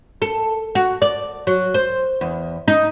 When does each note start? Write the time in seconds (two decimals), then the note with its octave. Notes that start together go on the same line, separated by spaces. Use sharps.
0.22 A4
0.75 F#4
1.02 D5
1.47 F#3
1.74 C5
2.21 E2
2.68 D#4